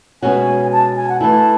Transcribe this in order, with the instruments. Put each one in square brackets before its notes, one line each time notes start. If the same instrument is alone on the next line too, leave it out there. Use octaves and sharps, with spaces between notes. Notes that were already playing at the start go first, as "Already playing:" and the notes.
[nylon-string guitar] B2 G#3 C#4 F#4 [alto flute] G#5
[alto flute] A5
G#5
F#5
[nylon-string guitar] E3 A3 E4 [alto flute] A5